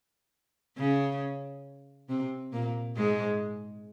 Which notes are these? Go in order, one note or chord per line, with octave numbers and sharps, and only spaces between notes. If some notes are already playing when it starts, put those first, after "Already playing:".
C#3 C#4
C3 C4
A#2 A#3
G#2 G#3